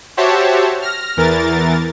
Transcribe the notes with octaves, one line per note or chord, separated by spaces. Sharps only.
F#4 G4 C5 C#5 E5 A5
F6 A#6
E2 E3 A#4 A6